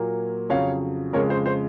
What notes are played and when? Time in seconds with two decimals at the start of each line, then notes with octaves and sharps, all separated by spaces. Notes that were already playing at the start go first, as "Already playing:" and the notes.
Already playing: A#2 F#3 A#3
0.49 F2 C#3 F#3 C#5 F5
1.13 F2 C#3 G#3 A#4 C#5
1.30 C5
1.46 C5